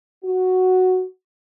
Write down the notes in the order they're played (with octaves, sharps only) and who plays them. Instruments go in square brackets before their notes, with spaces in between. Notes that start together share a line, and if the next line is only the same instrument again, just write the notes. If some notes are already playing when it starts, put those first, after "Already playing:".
[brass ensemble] F#4